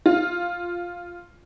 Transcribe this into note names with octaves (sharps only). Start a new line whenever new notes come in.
F4